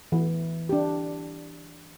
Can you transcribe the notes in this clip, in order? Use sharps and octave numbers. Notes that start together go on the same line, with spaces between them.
E3 E4
D4 G4